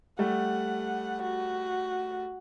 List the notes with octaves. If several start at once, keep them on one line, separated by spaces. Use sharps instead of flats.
G3 A3 F#5
F#4